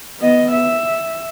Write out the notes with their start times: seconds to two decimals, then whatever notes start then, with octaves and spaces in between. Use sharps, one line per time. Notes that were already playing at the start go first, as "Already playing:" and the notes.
0.20 B3 D#5
0.52 E5